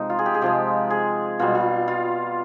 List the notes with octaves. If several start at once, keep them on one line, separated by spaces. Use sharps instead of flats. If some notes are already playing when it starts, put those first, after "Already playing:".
Already playing: C3 F3 G#3 D#4
F4
G#4
G4
G#4
C3 F3 G#3 G4
G#4
B2 G3 F4
F4
F4